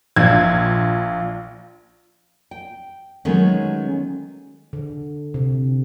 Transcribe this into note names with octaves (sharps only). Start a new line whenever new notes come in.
A#1 F4 E6 G#6
G5
D#3 F#3 G#3 A3 B3 C#4
D3
C3